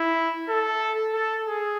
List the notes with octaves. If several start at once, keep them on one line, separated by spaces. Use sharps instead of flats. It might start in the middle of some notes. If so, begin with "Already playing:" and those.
Already playing: E4
A4
A4
G#4